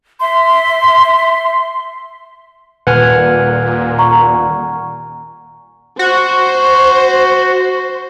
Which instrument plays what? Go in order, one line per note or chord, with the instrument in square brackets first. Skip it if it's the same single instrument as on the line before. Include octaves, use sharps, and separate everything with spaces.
[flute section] E5 C6
[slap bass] D#1 [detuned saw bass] A#2 [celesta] B4 [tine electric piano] F#5 G#5 F6
[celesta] A#5 C#6
[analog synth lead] F#4 [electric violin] C5